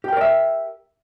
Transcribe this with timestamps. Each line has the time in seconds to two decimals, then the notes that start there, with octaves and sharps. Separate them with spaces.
0.04 G4
0.08 G5
0.13 A#4
0.17 D5
0.21 E5